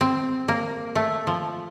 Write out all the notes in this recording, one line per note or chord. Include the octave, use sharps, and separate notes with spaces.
C4
A#3
A3
F3